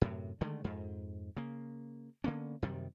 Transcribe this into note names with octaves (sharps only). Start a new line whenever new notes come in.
F#2 A2 C3
D3 D#3 G#3 A3
F2 G#2
C#3 A#3
D3 A#3 B3 C#4
F#2 C3 D#3 G3